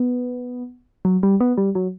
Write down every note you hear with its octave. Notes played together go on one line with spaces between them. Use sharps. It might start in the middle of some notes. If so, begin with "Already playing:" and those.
Already playing: B3
F#3
G3
B3
G3
F#3